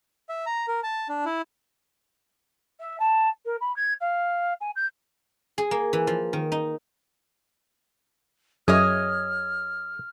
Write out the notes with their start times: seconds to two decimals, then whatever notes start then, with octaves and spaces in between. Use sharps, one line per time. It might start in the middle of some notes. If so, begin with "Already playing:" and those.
0.29 E5
0.46 A#5
0.68 A#4
0.83 A5
1.09 D4
1.26 E4
2.80 E5
2.99 A5
3.45 A#4
3.60 B5
3.76 G#6
4.00 F5
4.60 G#5
4.75 G6
5.58 G#4
5.71 A#3
5.93 E3
6.07 F3
6.33 D#3
6.52 D#4
8.68 F#2 G#4 C#5 D#5 F6